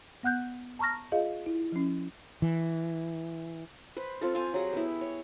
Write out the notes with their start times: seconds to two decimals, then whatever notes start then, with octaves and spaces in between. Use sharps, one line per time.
0.23 B3 F#5 F#6 G6
0.79 A5 A#5 C#6 F6 A#6
1.12 F4 G#4 D#5 F5
1.46 E4
1.72 F3 C#4
2.42 E3
3.97 B4 C5
4.21 C4 F4 A4
4.35 F4 C5 F5 G#5
4.54 F#3 G4 G#4 F#5
4.73 B3 E4
5.01 C#5